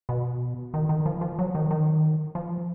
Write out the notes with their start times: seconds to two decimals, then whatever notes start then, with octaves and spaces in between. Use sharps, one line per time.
0.09 B2
0.74 D#3
0.89 D#3
1.06 F3
1.21 F3
1.39 F#3
1.55 D#3
1.71 D#3
2.35 F3